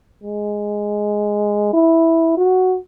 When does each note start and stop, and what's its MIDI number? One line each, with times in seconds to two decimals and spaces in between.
0.24 1.71 56
1.73 2.33 64
2.37 2.76 66